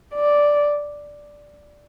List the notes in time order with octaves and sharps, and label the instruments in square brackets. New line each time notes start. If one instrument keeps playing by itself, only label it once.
[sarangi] D5